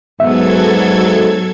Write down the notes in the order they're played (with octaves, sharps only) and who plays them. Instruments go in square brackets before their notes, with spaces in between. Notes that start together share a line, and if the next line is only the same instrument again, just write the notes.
[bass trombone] G#2 [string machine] F#3 A4 G#6 [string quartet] B3 [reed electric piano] E5